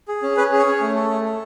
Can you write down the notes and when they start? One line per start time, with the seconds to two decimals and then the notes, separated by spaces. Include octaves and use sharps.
0.08 G#4
0.23 C#4
0.37 C#4 B4
0.52 G#4
0.59 C#5
0.66 C#4
0.81 A3
0.95 A4
1.10 A3
1.24 A4